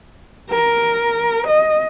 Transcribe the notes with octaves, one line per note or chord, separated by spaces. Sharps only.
A#4
D#5